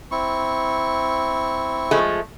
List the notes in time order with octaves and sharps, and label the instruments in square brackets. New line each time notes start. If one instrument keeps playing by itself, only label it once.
[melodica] C4 E4 C#6
[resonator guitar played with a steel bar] F3 G#3 A3